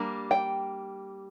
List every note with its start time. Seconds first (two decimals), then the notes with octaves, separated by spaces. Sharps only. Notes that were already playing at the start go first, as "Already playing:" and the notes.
Already playing: G3 A#3 D4
0.31 G5